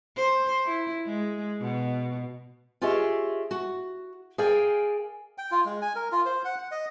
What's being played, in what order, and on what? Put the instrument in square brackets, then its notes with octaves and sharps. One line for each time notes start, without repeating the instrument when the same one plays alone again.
[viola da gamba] C5
E4
G#3
B2
[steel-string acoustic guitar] F4 G4 G#4 C#5 D#5 E5
F#4
G#4 A#4 D5 F5 G5 G#5
[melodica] G5
F4
G#3
G#5
A#4
F4
C5
F#5
F#5
D#5